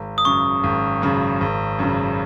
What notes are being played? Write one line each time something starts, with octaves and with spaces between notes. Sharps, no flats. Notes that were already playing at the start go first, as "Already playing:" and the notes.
Already playing: G#1
D#6
F#2 C#3 C#6
G#1
F#2 C#3
G#1
F#2 C#3